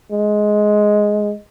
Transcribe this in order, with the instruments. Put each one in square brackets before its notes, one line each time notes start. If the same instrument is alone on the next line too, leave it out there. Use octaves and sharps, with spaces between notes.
[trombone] G#3